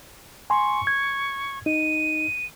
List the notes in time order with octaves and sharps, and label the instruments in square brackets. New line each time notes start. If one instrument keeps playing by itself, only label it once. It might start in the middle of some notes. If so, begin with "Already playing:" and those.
[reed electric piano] G#5 C6 [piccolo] C#6
[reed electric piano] G#6
[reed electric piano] D#4 [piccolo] D#7